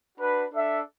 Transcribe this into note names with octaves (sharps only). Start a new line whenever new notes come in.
D4 F#4 B4
D4 A4 E5